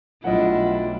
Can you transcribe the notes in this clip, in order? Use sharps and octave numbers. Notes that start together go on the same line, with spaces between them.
B1 G3 A3 D4 E4 F4 D#5 F#5